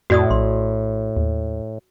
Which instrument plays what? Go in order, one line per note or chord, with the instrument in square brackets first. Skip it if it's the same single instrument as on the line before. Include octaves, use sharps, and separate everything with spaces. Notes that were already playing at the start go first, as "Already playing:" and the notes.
[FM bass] F2 [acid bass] A2 [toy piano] F#4 D5 D#6
[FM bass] A#1 [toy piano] C6
[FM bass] D#2